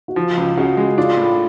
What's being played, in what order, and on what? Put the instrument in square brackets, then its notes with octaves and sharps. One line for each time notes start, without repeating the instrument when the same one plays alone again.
[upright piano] F#4
[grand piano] F3 [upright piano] F4
[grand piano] C#2
[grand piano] C#3 [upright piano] F#4
[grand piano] G#3
[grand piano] D4 [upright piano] F4
[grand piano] A2